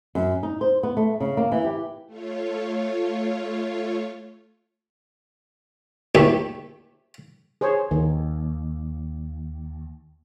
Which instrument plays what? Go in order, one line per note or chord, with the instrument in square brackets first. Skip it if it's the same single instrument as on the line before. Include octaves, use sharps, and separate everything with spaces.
[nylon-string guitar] F#2
D#4
C5
B3
A3
C#3
A#3
E3
G4
[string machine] A3 F4 C#5
[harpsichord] A#1 D#3 A3 G4
[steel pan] G#4 C5 C#5
[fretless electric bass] D#2 [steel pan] D#3